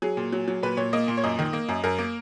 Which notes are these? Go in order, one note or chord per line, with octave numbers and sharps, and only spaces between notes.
F#3 G#4
A#2
F#3
F#3
A#2 B4
A#2 C#5
A#3 D#5
A#2
C#5
F#2 D#5
D#3
A#3
F#2
F#2 A#4
A#3